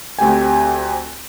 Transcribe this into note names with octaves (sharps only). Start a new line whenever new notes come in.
D2 A3 C4 G4 G5 G#5